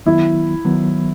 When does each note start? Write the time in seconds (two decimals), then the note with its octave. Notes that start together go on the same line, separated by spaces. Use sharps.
0.06 D#3 F#3 B3 E4
0.65 D#3 F#3 B3